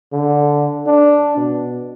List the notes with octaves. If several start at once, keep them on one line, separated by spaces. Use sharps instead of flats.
D3
D4
B2